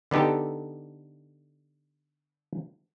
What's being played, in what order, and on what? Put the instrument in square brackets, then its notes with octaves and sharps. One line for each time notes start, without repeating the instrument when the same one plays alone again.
[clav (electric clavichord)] D3 B3 D#4 G4 A4